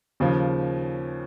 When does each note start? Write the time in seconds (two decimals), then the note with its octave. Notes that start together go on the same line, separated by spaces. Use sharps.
0.20 D#2 C#3 F3